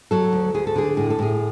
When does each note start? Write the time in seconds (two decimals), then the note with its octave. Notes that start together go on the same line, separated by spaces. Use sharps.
0.11 F#3 A4
0.33 D2
0.54 D2 G#4
0.67 A4
0.76 D3 G#4
0.97 A2 G#4
1.10 A4
1.19 A2 G#4